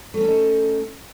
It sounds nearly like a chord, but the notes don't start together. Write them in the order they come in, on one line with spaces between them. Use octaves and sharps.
A3 C4 C#4 A4 D#4